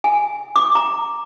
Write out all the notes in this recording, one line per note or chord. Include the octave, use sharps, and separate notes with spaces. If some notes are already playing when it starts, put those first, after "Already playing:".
G#5
D6
A#5